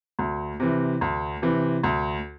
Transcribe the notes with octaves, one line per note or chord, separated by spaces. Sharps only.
D2
C3 E3
D2
C3 E3
D2